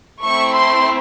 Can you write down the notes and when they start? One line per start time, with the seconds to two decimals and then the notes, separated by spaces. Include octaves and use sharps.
0.23 A3 C4 E4 C#6
0.54 C6